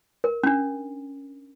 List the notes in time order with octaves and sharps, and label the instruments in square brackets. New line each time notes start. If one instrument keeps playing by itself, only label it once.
[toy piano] A#4
C#4 D4